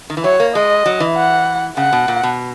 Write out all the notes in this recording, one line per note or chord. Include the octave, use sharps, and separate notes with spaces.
D#3
E3
F#3 C#5
A#3
G#3 D#5
F#3
E3
F#5
C#3 F#5
B2
A#2
B2